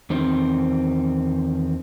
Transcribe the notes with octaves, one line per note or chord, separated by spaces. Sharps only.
E2 D#3 C4